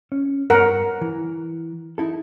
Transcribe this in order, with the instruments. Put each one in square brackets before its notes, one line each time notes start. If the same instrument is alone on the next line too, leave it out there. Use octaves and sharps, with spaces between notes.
[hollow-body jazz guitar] C#4
[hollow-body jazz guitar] G2 B3 C#5 [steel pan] A#4 F#5
[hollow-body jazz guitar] E3
D#4 E4 A4